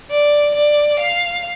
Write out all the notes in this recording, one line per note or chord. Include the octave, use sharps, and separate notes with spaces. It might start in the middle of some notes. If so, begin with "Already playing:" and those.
D5
D5
F5